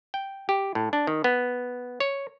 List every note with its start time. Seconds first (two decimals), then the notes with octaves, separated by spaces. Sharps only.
0.14 G5
0.49 G4
0.75 A2
0.93 D4
1.07 D#3
1.24 B3
2.00 C#5